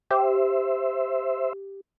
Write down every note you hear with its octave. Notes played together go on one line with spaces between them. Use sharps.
G4 C5 E5